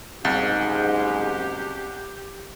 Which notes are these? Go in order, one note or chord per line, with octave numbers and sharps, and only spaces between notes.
F#1 C2 G#2 G4 F5 A6